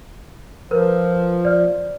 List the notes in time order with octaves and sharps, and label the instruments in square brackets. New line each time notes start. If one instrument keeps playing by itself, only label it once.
[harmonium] F3 [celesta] A#4 B4
[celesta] D5 F6